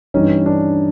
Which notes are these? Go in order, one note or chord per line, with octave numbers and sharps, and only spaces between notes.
G2 E3 G3 C#4 D#4
D4